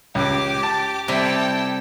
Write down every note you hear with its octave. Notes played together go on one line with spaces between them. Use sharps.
C#2 G4 D6
A5
C3 G3 E4 A4 G5